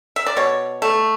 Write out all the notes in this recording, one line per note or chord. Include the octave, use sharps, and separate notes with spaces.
E5
D5
B2 C#5
A3